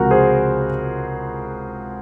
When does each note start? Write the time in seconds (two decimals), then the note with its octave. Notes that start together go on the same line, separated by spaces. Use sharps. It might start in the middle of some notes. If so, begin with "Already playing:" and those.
Already playing: C#2 C3 F3 F#4 A#4
0.10 G#4 C5